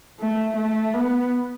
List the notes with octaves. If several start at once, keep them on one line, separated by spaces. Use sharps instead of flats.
A3
A3
B3